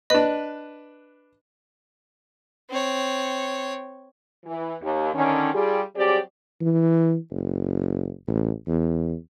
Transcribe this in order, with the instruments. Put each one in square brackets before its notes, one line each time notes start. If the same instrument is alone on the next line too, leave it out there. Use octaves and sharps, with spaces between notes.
[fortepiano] D4 B4 [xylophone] D#5
[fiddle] C4 C#5
[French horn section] E3
D#2
D3 D#3 C#4
G3 F4 G4 G#4
F#3 G3 C4 G4 G#4 D5
[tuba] E3
F#1
A1
E2